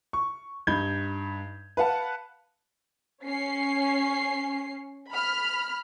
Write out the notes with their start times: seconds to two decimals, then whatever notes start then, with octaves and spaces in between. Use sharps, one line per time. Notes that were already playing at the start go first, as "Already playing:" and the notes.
0.13 C#6
0.67 G2 D#4 B5 G6 G#6 G7
1.77 B4 F5 F#5 A5
3.24 C#4 C7
5.11 B5 F6